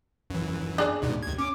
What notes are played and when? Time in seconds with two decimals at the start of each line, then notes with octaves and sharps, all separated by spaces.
0.30 F#2 E3
0.78 D4 G#4 D5
1.02 D#2 G#2 B2
1.23 D#2 G#6
1.38 C#4 D6